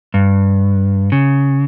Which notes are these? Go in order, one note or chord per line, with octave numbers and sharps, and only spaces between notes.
G2
C#3